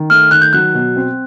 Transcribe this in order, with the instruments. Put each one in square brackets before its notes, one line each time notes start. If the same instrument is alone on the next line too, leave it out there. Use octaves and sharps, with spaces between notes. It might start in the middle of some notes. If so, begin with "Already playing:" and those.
Already playing: [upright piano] D#3
[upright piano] A3 [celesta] F6
[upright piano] D#3 [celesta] F#6
[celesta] G6
[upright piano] F#3 [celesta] F#6
[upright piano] B2
C4